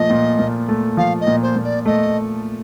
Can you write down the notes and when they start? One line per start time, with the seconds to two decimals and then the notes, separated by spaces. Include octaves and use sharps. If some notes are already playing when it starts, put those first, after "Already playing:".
Already playing: A#2 F3 A3 D#5
0.10 A#2
0.39 A#2
0.69 A3
0.97 F3 F5
1.20 D#5
1.27 A#2
1.42 C5
1.56 A#2
1.63 D5
1.85 A3 D#5